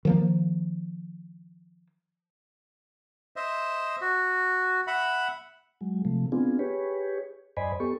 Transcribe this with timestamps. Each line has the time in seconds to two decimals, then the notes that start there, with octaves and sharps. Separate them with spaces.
0.05 D#3 F3 A#3
3.36 C5 D#5 E5
4.01 F#4
4.87 E5 F#5 B5
5.81 F#3 G#3
6.05 C3 F3 A3
6.32 B3 C4 D4 F4 G#4
6.59 G4 G#4 B4 C#5
7.57 F#2 C5 D5 D#5 G#5 B5
7.80 B3 G4 A4 C#6